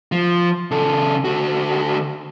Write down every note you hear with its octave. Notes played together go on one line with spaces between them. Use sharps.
F3
C#3 A4
D3 F#4